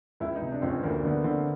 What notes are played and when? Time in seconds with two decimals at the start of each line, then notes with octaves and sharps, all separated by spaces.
0.20 C#2 E4
0.36 D#4
0.42 C3
0.52 D4
0.62 C#2 C4
0.68 C#4
0.84 D2 A#3
1.04 D3 B3
1.24 D3 C4